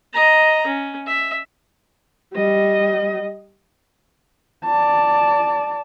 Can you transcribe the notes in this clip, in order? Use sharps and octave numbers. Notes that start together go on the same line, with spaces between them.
D#5 A#5
C#4
E5
G3 D#5
D5 A5